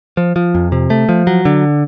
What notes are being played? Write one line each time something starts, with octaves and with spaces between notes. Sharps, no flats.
F3
F3
F2
C3
A3
F3
F#3
D3